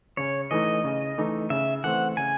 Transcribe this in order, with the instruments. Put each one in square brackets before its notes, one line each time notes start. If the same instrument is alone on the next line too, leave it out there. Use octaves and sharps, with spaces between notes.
[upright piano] C#3 [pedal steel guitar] C#5
[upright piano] E3 A3 D#4 [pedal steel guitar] D#5
[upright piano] C#3
E3 A3 D#4
[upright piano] C#3 [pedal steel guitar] E5
[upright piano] E3 A3 C4 [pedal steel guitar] F#5
[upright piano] C#3 [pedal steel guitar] G#5